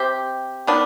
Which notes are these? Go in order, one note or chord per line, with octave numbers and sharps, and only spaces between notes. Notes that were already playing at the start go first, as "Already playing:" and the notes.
Already playing: C3 C4 G4
D#3 B3 D4